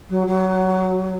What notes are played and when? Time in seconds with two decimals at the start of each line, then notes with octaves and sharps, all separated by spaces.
0.09 F#3
0.27 F#3